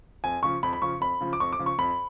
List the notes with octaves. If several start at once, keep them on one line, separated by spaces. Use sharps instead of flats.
F2 G#5
C#3 F3 C#6
F2 B5
B5
C#3 F3 C#6
F2 B5
C#3 F3
D6
F2 C#6
D6
C#3 F3
C#6
F2 B5